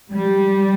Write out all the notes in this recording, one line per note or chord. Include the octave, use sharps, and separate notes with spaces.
G3